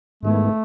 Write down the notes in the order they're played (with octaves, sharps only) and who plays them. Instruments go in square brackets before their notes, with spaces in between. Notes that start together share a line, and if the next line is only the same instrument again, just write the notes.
[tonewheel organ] G#2 D#3 G#3 B3 E4 [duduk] A3